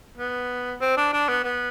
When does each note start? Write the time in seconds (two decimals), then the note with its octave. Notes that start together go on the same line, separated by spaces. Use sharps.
0.18 B3
0.81 C4
0.97 D4
1.13 D4
1.29 B3
1.44 B3